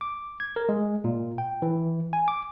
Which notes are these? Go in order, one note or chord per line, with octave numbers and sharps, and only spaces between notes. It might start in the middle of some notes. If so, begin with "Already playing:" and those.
D6
G#6
A#4
G#3
A#2
G5
E3
G#5
D6